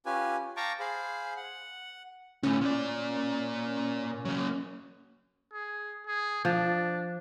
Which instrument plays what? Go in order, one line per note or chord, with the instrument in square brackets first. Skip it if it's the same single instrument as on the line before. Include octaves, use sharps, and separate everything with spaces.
[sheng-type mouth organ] C#4 F4 G4 B4 G#5
F5 G5 A5 A#5 C#6 D6
G#4 C5 F5 B5
F#5
[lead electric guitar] D2 A2 [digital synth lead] C#4
[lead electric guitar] A#2 D5
F#3 A#3
[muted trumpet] G#4
G#4
[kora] F3 [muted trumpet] D4